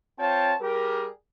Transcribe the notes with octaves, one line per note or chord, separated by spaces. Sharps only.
C4 F4 C#5 G5 A5
G3 G4 G#4 A#4